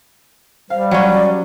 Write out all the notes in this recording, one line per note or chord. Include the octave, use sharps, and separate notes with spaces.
G3 C5 F5
F3 F#3 C#4 D5 F#6 C7